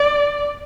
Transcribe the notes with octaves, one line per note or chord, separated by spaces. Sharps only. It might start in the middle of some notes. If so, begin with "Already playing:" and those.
Already playing: D5